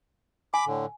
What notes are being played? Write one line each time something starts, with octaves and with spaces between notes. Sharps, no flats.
G#5 B5 D6
A2 D3